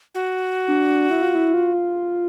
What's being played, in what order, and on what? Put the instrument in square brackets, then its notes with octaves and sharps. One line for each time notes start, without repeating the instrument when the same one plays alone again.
[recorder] F#4
[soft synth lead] D4
E4
F4
E4
F4